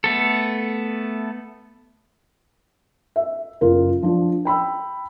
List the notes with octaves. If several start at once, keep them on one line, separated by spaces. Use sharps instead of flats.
A3 B3 A4
E5
F#1 F4 A#4
F3 D4
G5 B5 E6